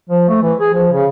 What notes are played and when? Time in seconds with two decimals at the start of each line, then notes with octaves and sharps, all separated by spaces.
0.09 F3
0.29 A3
0.42 E3
0.60 G#4
0.73 F3
0.92 C#3